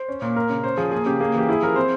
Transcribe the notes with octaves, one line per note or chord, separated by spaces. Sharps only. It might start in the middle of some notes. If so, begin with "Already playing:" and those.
Already playing: C5
C#4
A#2
A#3 A#4
C#3
C#4 C5
F3 G#4
A#3 G#4
C#3 G4
A#3 G#4
E3 G4
E4 G#4
F3 A#4
C4 C5